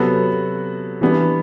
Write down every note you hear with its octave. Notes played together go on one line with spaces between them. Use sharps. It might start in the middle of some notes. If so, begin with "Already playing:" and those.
Already playing: C3 F#3 B3 F#4 A4
E3 G3 B3 D4